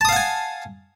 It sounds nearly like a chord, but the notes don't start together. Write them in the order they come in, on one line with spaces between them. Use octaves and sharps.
A5 D#6 F5 F#5 G#5